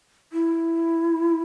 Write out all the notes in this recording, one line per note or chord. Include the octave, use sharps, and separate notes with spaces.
E4